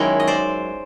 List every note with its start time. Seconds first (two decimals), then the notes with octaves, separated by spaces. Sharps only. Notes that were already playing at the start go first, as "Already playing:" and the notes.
Already playing: F#2 D#3 G#3 C#4 E4 C#5
0.20 D#5
0.27 C5 D5